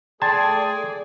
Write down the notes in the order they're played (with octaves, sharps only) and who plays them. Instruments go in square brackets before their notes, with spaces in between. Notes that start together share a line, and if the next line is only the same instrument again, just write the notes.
[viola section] A3 D5 [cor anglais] G#4 [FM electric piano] G5 C6 G#6 [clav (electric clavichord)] A5